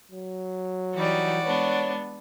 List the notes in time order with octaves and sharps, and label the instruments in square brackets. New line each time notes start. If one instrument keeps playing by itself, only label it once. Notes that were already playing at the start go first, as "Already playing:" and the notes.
[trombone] F#3
[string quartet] E3 G3 D#4 [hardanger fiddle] F#4 D5
[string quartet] G#3 B3 D4 [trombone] C#5